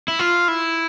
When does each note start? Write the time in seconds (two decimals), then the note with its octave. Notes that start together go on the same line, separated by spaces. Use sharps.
0.08 E4
0.19 F4
0.48 E4